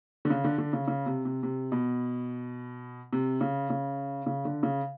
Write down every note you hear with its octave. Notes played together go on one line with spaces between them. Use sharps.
D3
C#3
D3
D3
C#3
C#3
C3
C3
C3
B2
C3
C#3
C#3
C#3
D3
C#3